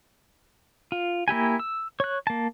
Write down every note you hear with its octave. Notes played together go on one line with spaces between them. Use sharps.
F4
A#3 E4 G4 G#5
E6
C#5 F#6
A#3 A5